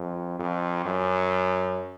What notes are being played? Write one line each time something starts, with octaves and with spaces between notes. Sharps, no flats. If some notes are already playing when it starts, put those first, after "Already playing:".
Already playing: F2
F2
F#2